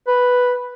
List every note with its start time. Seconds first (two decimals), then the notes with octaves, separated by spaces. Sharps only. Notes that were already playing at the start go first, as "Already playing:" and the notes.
0.08 B4